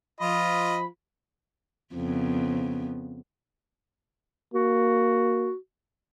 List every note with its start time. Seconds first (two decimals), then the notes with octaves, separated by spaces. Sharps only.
0.21 F3 F4 D#5 B5
1.94 F2 C#3 B3
4.54 A#3 F#4